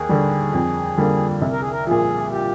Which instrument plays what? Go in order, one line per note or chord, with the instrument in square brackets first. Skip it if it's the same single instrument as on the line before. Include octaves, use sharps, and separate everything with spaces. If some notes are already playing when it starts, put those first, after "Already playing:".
Already playing: [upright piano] D#2 [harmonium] G#4
[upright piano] D3 G3
F2
D3 G3 A#3
C2
[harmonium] A#4
G#4
A#4
[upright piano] A#2 F3 [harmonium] G#4
[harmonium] G4